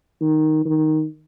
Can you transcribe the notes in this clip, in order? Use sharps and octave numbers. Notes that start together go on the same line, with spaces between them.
D#3
D#3